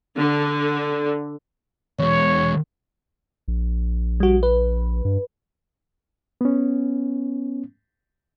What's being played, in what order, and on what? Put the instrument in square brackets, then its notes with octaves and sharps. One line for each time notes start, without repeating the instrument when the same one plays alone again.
[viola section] D3
[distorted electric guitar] E2 G#3 [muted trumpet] C#5
[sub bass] A#1
[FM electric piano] G3 F#4
B4
[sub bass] G2
[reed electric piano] B3 C#4